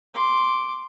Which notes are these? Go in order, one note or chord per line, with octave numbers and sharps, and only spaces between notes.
C6 D6